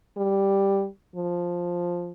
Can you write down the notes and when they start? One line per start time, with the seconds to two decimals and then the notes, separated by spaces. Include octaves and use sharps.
0.17 G3
1.16 F3